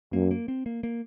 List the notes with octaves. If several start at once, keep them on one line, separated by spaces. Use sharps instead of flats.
F#2 A#3
A#3
C4
A#3
A#3